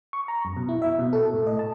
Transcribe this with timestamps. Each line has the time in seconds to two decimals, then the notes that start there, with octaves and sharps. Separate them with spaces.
0.13 C#6
0.28 A#5
0.45 F#2
0.57 B2
0.69 E4
0.82 E5
0.99 B2
1.13 A4
1.33 A2
1.47 D#5
1.59 A5